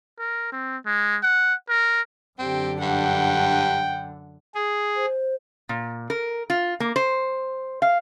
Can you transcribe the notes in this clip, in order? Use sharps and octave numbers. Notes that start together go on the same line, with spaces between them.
A#4
C4
G#3
F#5
A#4
F#2 D3 C4 G4
G2 F#5 G5
G#4
C5
A#2
A#4
F4
A#3
C5
F5